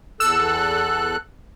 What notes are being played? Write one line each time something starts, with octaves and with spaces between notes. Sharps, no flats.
E2 A4 E6 F#6